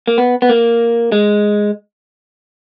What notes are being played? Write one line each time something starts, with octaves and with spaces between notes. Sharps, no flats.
A#3
B3
B3
A#3
G#3